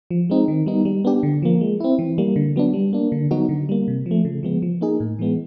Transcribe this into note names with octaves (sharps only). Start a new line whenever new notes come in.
F3
G#3 C4 D#4
D#3
G3 B3 D#4
G3
B3 D4 G4
D3
F3 A#3
G#3
C4 E4
E3
G3 A#3
D3
F#3 B3 D4
G3
A#3 D4
D3
F#3 B3 D#4 F#4
D3
G3 A#3
C3
F3
A3
C#3
F3 G#3 B3
F3
A#3 D#4 G#4
A2
E3 G#3 B3